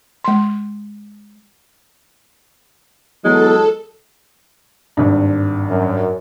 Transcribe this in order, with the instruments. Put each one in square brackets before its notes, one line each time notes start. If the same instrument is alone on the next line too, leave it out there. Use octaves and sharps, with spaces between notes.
[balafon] G#3 C6
[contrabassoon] E2 [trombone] F#3 [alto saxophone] G#3 [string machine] A4
[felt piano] G#1 G2
[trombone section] F#2